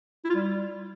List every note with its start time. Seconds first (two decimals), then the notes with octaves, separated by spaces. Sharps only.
0.25 E4
0.30 F4
0.35 G3